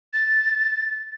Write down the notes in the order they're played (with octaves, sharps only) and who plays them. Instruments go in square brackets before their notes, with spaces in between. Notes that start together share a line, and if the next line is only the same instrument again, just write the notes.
[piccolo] A6